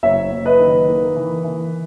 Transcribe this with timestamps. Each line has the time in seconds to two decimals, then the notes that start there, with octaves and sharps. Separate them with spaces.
0.03 F#1 C#5 E5
0.32 F#1
0.46 B4 D#5
0.59 D#3
0.88 A#3
1.16 E3
1.44 E3